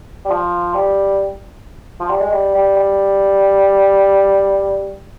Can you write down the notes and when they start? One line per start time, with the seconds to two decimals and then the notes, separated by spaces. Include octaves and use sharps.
0.25 G3
0.30 F3
0.75 G3
2.00 F3
2.09 G3
2.20 G#3
2.31 G3
2.54 G3
2.77 G3